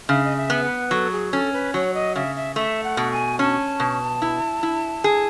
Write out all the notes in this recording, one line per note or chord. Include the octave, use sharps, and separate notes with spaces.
C#3 E5
D#5
E5
B3
B4
F#3 A4
G#4
C#4 A4
B4
F#3 C#5
D#5
C#3 E5
E5
A3 E5
F#5
B2
G#5
C#4 A5
B2
E4
E4
G#4